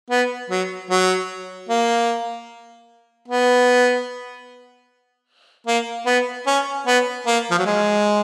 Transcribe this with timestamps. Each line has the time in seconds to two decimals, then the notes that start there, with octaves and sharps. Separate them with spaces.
0.10 B3
0.50 F#3
0.90 F#3
1.69 A#3
3.28 B3
5.67 A#3
6.06 B3
6.46 C#4
6.86 B3
7.26 A#3
7.51 F3
7.58 F#3
7.66 G#3